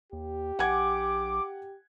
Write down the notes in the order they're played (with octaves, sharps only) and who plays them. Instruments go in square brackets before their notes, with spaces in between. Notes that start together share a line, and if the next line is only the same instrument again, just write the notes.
[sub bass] D#2 [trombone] G4
[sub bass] A#1 [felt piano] F#5 G#5 G#6 [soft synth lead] D6